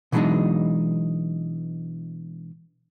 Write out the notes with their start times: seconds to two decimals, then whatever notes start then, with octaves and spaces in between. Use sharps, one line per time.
0.12 B2 E3 F#3 G#3 D4 D#4